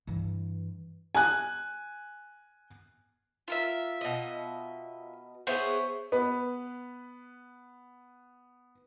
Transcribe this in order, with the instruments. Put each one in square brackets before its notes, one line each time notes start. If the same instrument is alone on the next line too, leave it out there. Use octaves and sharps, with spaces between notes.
[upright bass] G2 E3
[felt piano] G#5 F#6
[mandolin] F4 A#4 E5
[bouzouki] B2 D#5
[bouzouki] B3 E4 G#4 [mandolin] C5 C#5
[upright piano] B3 B4